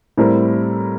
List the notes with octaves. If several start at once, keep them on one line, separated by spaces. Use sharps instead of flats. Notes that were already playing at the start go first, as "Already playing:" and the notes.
A2 G3 C4 E4 A#4